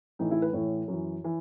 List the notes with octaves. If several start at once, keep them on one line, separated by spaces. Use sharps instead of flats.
A2 E3 D#4
E4
B4
A2 E3 C#5
F#2 E3
E3